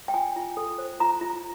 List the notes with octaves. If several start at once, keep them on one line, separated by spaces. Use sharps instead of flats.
G5
F4 G#5
F4
A4
C5
F4 A#5
F4